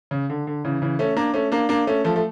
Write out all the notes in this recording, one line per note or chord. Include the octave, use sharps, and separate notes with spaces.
C#3
D3
D3
C#3 E3
C#3 E3
A3 C#4
A#3 D4
A3 C#4
A#3 D4
A#3 D4
A3 C#4
F3 A3
A3